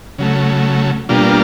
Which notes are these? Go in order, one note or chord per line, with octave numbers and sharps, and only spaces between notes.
C#3 F#3 A3
B2 G3 A#3 D4 F4